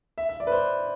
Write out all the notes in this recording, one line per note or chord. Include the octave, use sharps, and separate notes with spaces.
E5
E5
D5
B4
C5